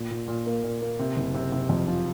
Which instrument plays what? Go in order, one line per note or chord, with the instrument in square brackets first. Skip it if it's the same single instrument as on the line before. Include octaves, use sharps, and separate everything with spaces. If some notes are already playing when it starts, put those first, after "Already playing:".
Already playing: [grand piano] A#2
A#2
A#2
A#3
A#2
A#3
C3
F#1
C3
C3
F2
F3